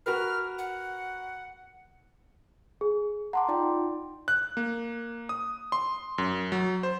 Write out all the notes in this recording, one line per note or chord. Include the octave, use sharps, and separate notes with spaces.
F#4 A#4 B4 F6
F#5
G#4
F#5 A5 A#5 C6 D6
D#4 F4 D5 G5
F#6
A#3
D#6
C6
F#2
F#3
C5